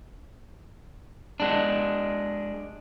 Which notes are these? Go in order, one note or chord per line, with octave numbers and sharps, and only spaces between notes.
G#3 D4